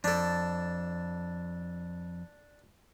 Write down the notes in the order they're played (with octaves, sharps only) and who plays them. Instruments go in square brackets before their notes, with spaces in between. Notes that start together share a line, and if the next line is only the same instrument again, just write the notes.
[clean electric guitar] F2 [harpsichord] D4 A4